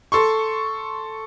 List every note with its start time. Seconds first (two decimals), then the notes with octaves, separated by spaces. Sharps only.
0.12 A4 C6 C#6